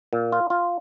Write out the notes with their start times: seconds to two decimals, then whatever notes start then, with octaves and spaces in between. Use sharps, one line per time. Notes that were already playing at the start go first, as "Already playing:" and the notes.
0.13 A#2
0.32 F4
0.50 F4